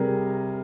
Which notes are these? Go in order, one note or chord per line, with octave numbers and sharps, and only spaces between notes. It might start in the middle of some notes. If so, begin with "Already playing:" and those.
Already playing: C3 G3 G#4 A#4